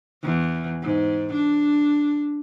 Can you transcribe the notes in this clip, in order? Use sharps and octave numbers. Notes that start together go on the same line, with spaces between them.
E2
G#2
D4